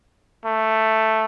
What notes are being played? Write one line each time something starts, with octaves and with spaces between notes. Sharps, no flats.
A3